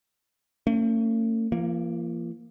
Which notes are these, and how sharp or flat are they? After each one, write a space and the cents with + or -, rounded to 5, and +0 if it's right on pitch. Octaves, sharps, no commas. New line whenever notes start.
A3 +45 C#4 +0
F3 -40 A#3 +0